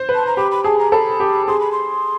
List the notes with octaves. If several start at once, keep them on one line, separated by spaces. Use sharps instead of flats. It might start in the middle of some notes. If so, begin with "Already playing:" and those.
Already playing: C5
B4
A5
A#5
G4 B5
B5
G#4 A5
A#5
A4 B5
G4
G#4 C6
B5
C6